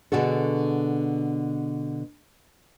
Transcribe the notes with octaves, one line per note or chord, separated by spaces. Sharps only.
B2 D3 F#4 G#4 A4